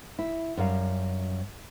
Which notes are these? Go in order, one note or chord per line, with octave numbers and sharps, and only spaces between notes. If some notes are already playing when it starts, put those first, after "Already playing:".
E4
F#2 G3 F5